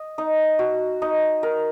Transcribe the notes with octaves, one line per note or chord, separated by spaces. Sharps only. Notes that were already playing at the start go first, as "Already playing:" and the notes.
Already playing: D#5
D#4
F#4
D#4
A#4